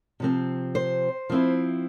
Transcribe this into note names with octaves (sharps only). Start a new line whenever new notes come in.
C3 F3 C4
C5
F3 C4 E4